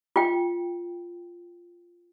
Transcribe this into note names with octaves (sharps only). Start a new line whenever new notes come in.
F4 G5